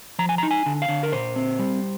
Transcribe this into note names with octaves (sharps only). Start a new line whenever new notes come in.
F3 A#5
G#5
A#5
D#4
G#5
D3
F5
D3
A#4
A#2 C5
C4
G3